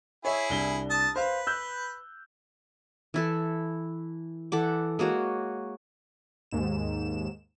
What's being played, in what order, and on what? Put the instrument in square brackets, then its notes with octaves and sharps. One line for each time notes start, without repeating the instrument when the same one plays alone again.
[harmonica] E4 G#4 [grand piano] C#5 E5
[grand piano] C2 D4 G7
[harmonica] A5 D#6
[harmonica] B4 [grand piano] C5 F5
[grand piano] E6 F#6 G6
[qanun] E3 E4 A4
E3 A4 F#5 D6
G#3 A#3 F#4 C#5
[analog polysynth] D#2 G#2 E7